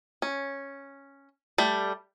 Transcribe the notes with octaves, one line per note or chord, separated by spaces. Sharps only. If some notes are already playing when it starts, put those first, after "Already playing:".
C#4
G3 A3